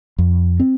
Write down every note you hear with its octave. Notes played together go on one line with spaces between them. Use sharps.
F2
C4